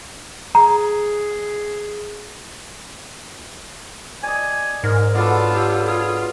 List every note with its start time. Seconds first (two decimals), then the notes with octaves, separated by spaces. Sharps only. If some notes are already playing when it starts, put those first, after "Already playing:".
0.55 G#4 A#5
4.23 D5 D#5 G#5
4.84 G#2 A#4
5.15 D3 F#3 B3 F4 A4 D5
5.54 G4
5.87 F4 G#4